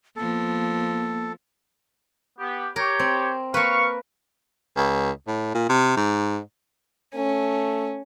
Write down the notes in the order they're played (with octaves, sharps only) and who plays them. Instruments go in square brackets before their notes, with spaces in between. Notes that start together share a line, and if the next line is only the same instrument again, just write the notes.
[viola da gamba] F3 B3 [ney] A#3 [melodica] A4
[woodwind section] B3 G4
[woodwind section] G4 C#5 [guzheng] A#4
[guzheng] C4
[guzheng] A#3 B4 [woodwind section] F5 C#6
[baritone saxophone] C#2
A2
A#2
C3
G#2
[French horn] A3 [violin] C#4